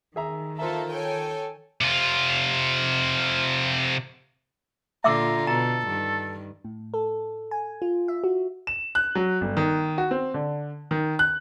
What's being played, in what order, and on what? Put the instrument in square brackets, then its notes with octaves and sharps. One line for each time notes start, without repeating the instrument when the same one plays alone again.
[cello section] D#3 [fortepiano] G#4 E5 A#5
[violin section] A#3 A4 C5 [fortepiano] F4 A#4 A#5 [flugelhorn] E5
[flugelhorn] A4 [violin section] C#5 G5 G#5
[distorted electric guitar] C3 F4
[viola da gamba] A#2 D3 F4 [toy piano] E5 D6 E6 [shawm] A#5
[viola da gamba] B2 [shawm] A4 [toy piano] A#5
[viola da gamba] G2 D#3
[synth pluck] A2
A4
G#5
F4
E5
F#4
[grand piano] E7
F#6
F#3
G1
D#3
F#4
C4
D3
D#3
F#6